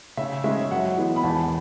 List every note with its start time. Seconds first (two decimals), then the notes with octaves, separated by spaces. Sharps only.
0.17 C#3 E5
0.44 G#3 C#4 E5
0.70 F#2 F#5
0.97 E3 G#3 B3
1.16 B5
1.23 E2 A5